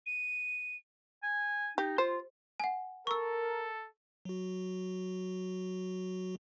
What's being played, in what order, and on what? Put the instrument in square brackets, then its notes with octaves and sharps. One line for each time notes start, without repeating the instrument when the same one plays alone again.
[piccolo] D#7
[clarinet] G#5
[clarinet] D#4 [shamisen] G4
[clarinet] F4 [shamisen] C5
[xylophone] F#5 G#5
[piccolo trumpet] A4 [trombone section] A#4 [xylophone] C#6 E6
[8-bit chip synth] F#3 F#4